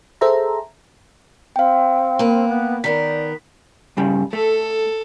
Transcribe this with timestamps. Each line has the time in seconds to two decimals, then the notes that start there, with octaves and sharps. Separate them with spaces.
0.21 G#4 A4 C5 E5 A#5
1.56 C4 F5 G5
2.19 A#3 B4
2.47 B3
2.84 D#3 B3 A#4 D5 B6
3.97 G2 C#3 G3
4.33 A3 A4